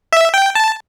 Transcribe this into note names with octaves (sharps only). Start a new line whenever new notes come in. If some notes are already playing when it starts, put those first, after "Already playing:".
E5
G5
A5